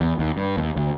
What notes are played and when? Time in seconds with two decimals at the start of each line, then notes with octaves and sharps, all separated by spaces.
0.01 E2
0.19 D#2
0.37 G2
0.57 D#2
0.76 D2